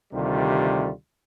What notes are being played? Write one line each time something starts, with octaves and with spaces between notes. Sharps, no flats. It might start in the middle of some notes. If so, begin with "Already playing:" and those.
D2 C3 D#3 G3 A3 F4